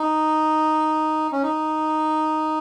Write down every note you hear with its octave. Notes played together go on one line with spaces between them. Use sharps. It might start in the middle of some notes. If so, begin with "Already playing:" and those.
Already playing: D#4
C#4
D#4